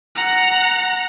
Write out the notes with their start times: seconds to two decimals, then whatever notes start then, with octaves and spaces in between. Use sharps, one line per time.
0.16 F#5 A#5